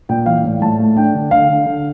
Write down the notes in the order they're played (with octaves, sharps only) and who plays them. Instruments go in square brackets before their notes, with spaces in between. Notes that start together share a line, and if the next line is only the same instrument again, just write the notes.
[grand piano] A#2 G5
E3 F5
A2
A2 A5
A3
D4 G5
D3
D3 F5
D3
D3